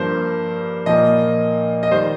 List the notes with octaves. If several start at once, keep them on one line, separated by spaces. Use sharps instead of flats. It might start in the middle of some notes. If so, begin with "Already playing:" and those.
Already playing: G2 F3 A#3 C5
A#2 F3 A#3 D#5
D#5
D#3 G3 C5